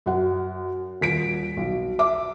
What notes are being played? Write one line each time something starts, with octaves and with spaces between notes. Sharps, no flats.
F#2 F#5
D#1 B6 D7
B1
E5 D6